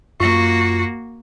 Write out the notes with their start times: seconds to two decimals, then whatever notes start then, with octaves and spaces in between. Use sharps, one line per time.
0.20 F#2 A#3 F4 F#4 C#6